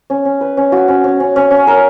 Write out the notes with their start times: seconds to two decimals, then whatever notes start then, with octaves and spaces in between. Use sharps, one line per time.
0.10 C#4
0.25 C#4
0.41 B4
0.57 C#4
0.72 F#4
0.88 C#4
1.04 C#4
1.20 C#4
1.36 C#4
1.51 C#4
1.67 A#4